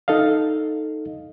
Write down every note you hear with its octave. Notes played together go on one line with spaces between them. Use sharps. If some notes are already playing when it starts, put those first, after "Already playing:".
D#4 A4 D#5 F5